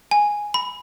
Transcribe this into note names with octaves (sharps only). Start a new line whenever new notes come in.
G#5
B5